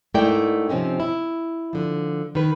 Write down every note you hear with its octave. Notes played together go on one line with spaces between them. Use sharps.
G#2 A3 E4 A#4 D5 G5
C3 F3 C4 C#4 D#4
E4
D3 F3
D#3 B4